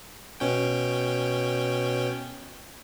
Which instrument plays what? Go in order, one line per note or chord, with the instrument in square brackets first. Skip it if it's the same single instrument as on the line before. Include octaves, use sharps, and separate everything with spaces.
[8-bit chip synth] B2 C#4 G5